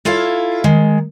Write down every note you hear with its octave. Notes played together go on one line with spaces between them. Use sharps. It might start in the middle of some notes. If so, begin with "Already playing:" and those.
E4 F4 A4 C#5 F5
D#3 G#3